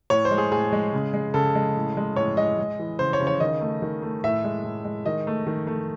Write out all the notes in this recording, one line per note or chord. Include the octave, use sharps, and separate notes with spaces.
A2 C#5
C5
G#3
G#4
A2 G#4
G#3
C#3
G#3
C#3 A4
G#3
A2
G#3
A2 C#5
G#3 D#5
G#3
E3
C#3 C5
C#5
C#3
C#5
D#3 D#5
A3
D#3
A3
A2 E5
G#3
A2
G#3
D#3 D#5
A3
D#3
A3